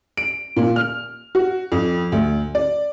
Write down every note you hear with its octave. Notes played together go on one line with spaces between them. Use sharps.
D7
A#2
F6
F#4
F2
D2
D5